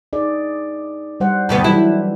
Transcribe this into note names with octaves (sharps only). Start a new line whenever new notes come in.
D#4 G#4 D5
G3 C5 F#5
D2 G2 B3
E3 F#3 G3 E4